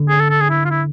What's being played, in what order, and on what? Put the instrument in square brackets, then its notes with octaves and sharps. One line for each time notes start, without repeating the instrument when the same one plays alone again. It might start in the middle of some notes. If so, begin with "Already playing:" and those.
Already playing: [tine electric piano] D3
[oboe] G#4
A4
A4
G#4
E4
F4
E4